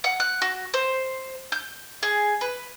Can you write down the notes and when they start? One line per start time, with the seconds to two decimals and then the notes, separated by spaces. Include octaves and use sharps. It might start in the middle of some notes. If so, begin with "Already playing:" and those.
0.04 F#5
0.20 F#6
0.42 F#4
0.74 C5
1.52 G6
2.03 G#4
2.41 B4